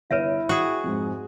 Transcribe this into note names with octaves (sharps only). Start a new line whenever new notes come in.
G1 E4 B4 C#5 E5 D7 D#7
F#4 G#4 G5
F2 G#2